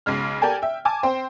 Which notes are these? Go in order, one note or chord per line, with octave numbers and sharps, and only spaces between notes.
B1 C#3 G#3 F6
G4 A4 A#4 D5 G#5 A5
E5 G5
G#5 A5 D6
C4 C5 G5